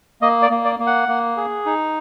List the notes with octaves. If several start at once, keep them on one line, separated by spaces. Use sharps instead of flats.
A#3 D#5
D5
A#3
D5
A#3
F#5
A#3
G#4
D#4